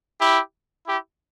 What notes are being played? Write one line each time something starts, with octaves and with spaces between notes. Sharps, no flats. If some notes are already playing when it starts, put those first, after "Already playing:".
E4 G4
E4 G4